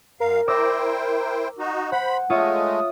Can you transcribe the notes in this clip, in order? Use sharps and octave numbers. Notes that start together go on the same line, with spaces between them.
F#2 A#4 F5
E4 C5 D5 G5 E6 A#6
D#4 F#4
C5 F#5 B5
G#3 A3 F4 C#5 E5 D#6